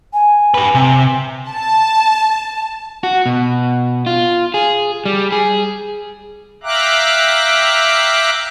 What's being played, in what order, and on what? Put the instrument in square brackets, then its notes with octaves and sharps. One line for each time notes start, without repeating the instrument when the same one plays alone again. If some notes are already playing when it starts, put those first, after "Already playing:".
[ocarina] G#5
[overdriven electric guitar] G4 B4
C3
[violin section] A5
[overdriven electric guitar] F#4
B2
F4
G#4
G3
G#4
[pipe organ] E5 F5 G5 A#5 D6 F#6